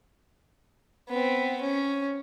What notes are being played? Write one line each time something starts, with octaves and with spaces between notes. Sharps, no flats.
B3 C4
C#4